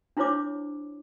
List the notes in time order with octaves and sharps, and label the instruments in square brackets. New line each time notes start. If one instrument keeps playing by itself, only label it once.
[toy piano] D4 E4 F4 C5 C#5 D6